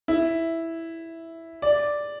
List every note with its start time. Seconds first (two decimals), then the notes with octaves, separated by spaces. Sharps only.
0.08 E4
1.62 D5